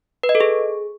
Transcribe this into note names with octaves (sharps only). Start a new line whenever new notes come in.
B4
D#5
A4
G#4